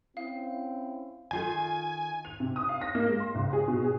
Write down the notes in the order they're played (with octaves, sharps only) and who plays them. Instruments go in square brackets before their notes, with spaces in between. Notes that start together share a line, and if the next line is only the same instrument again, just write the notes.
[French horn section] C4 C#4 E4 [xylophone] F5
[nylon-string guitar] D#3 F4 A4 [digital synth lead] G#5
[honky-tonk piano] F7
C3
D#6
F5
A#6
A#3
G#3
C6
C#2
G#4
B2
G#4